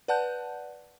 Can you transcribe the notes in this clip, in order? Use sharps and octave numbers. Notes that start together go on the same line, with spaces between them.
B4 D5 F#5 A5 F#6 G6